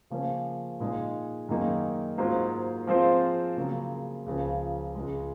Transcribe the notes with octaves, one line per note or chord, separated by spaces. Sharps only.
C#3 F3 A#3 C#4
A#2 G#3 D#4 G#4
F#2 D#3 A#3 D#4 G#4
G#2 F#3 A#3 F4 C5
F3 G#3 C4 F4 C5
C#3 F#3 A#3
C#2 C#3 F3
C#2 C#3 G#3